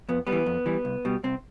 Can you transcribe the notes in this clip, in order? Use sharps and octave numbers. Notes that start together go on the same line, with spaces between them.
F2 B3
G3 B3
E3
F2
E3 G3
C2
B2 G3
C2 C4